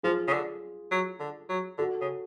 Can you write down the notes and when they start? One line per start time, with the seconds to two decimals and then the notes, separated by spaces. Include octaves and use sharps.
0.03 F3 F4 G#4
0.28 C#3
0.33 D3
0.91 F#3
1.20 D3
1.49 F#3
1.78 D3 F#4 A4
2.01 C#3